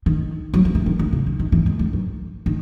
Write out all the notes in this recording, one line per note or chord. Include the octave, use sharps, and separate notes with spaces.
D#3
F#3
F3
E3
D#3
D3
C#3
D3
D#3
E3
G#3
G3
F#3
D#3